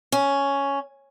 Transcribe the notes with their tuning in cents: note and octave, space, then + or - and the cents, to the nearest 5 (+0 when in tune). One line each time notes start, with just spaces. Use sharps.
C#4 +5